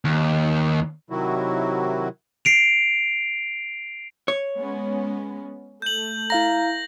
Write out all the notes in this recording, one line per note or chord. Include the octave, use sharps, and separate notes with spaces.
D#2
C3 D#3 F#3 E4 F#4
C7 D7 F7
C#5
G#3 B3 C#4
A3 G6 F#7
E4 F5 A#5 A#6